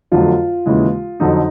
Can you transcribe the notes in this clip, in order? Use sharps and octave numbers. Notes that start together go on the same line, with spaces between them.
F2 D3 F#3 A3 F4
D#2 C#3 E3 G#3
F2 D3 F#3 D#4